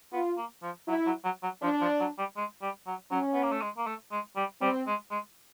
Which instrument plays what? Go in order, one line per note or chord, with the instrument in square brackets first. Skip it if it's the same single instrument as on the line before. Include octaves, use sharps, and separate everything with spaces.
[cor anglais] B3 [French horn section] F4
[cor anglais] A#3
F3
[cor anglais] F#3 [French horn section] E4
[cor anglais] F#3
F#3
F#3
[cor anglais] F3 [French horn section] D4
[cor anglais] F3
F#3
G3
G#3
G3
F#3
[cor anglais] F#3 [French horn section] C#4
[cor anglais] B3
A#3
A3
G#3
A#3
A3
G#3
G3
[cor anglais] G3 [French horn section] C4
[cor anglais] G#3
G#3